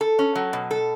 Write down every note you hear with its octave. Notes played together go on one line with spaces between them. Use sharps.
A4
C#4
F#3
B2
A4